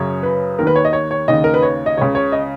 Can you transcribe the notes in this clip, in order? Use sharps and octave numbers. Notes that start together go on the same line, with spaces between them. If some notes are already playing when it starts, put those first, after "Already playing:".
Already playing: F#2 C#3 C#5
B4
D#2 D#3 A#4 B4
C#5
D#5
C#5
C#5
D#2 C#3 D#5
A#4
B4
C#5
D#5
C#2 C#3 C#5
C#5
D#5